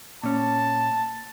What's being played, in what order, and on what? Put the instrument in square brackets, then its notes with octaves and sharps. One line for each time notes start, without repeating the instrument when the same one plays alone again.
[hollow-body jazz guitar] A#2 C#4 [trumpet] A5